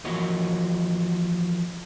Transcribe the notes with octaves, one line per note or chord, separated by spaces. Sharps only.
E3 F3 A#3 F#4 C#5 D#5